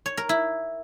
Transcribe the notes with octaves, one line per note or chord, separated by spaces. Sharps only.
C#5
A#4
E4